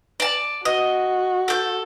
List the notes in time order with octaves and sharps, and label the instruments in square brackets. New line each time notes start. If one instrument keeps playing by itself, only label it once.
[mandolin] D5 A5
[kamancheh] F#4 [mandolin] D#5
[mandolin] A4 G6